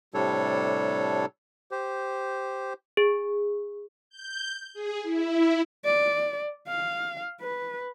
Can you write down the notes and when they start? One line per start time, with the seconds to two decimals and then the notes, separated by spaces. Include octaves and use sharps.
0.14 A2 C3 G3 D4 A4 C#5
1.71 G4 C5
2.97 G#4
4.10 G6
4.74 G#4
5.03 E4
5.85 D5
6.68 F5
7.41 B4